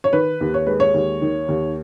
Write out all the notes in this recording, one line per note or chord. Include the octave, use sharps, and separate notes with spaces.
C#5
D#3 B4
D#2
C#5
G#3 B4
C#5
D#2
D#3
D#2